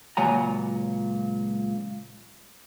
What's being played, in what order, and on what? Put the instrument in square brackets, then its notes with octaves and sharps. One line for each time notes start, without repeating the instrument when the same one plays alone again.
[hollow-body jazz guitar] C#2 A#2 F#3 F#5 G#5 A#5